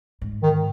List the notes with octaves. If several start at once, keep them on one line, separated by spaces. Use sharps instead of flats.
G#2
D#3